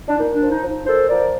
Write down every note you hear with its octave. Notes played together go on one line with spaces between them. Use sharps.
D4
A#2 D#4
D4
F3
D#4
F3
D#4
A#2 A4 C5
F3 A#4 D5